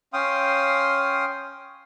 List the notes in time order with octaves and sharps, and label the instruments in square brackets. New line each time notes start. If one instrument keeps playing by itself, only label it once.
[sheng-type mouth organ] C#4 F5 G5 C6 D#6